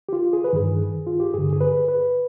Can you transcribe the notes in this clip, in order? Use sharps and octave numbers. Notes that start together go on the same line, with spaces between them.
G4
F4
G#4
B4
G2 D#3 G#4
F4
G4
G2 D3 G#4
G#4
B4
B4